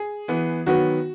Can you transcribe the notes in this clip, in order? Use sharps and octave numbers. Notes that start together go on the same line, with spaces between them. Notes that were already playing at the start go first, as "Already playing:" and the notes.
Already playing: G#4
E3 B3
D#3 F#3 B3 F#4